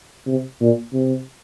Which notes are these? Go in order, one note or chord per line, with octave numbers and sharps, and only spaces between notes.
C3
A#2
C3